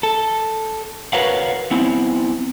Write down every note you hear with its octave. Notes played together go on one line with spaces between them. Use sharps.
A4
F#4 A#4 B4 C#5 F5 F#5
B3 C4 E4